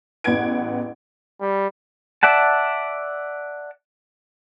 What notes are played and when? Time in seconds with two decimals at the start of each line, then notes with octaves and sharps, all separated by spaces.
0.24 A1 E2 B4 F#5 G#6 D7
1.41 G3
2.23 D5 E5 F#5 A5